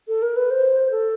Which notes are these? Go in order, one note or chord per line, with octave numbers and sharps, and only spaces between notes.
A4
A#4
B4
C5
A4